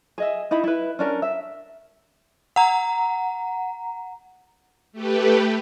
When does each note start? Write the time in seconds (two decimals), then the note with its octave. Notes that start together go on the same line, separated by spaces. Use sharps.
0.18 G#4 D#5 E5
0.51 D#4 E4 E5 B5
0.64 E4 B4
0.99 C#4 D4 A#4
1.22 E5
2.56 F#5 A#5
4.92 A3 G4 B4